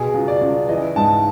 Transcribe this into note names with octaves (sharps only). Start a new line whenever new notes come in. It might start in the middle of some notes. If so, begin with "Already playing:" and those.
Already playing: B2 G#4
C#2
D5
C#2
E3 D#5
G#2 A5